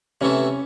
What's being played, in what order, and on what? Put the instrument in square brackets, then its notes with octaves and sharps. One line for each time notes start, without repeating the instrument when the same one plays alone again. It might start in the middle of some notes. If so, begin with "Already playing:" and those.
[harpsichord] C3 E3 A3 [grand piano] C#4